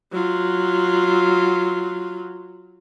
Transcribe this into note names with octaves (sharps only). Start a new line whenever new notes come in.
F#3 F4